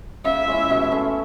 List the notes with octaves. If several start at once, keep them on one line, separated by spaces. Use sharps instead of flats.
C#3 E5
G#3 C#4 E4
B2
A3 C#4